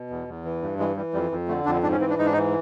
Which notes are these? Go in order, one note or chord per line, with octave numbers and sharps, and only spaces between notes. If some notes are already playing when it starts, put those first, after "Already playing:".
Already playing: B2
E2
E2
E3
G2
E3 G#3
E3 G3
F2 G3
F2
D3 A3
F2 D4
G#2 D4
C#4
E3 C4
D4
G#2 D#4
D4
D#4
E3